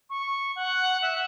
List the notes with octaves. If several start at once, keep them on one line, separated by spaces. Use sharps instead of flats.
C#6
F#5
E5